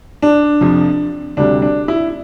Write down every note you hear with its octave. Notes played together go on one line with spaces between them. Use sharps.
D4
F2 C3 F3
D2 C3 G3 D4
D4
E4